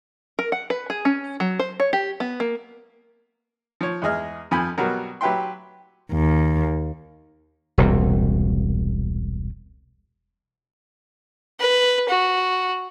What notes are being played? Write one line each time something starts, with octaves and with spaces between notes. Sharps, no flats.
A#4
F#5
B4
G#4
C#4
F#3
C5
C#5
G4
B3
A#3
F3 C#5
E2 G#3 G#4 D#5 F6
F2 F3 F4 G#5 B5
B2 F#3 G3 B3 F#4 A#4
F#3 G4 B4 E5 G5 C6
D#2
E1 C2 A#2
B4
F#4